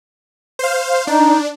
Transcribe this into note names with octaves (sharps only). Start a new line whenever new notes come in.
C5 F5
D4 D#4